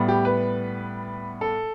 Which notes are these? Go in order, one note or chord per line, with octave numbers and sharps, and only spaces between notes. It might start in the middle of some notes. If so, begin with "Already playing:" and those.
Already playing: A2 G3 B3
G4
B4
A4